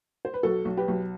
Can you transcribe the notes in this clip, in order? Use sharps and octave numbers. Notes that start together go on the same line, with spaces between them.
C5
B4
B1 F#4 A4
B1
G4 B4
B1